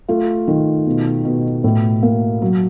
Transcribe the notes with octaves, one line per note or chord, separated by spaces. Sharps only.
A3 F4
D#3
B2
B2
A2
A#3
F#3